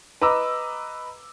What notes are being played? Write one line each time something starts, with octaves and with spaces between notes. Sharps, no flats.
B4 D#5 A#5 D6 E6